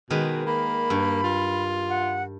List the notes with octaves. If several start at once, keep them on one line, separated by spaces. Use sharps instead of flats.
B2 D#3 G#3 B4
A#3 B5
G2
F4
F#5